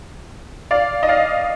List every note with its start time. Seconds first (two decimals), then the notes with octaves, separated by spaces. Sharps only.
0.71 D5 F5
1.03 D#5
1.09 D5 F5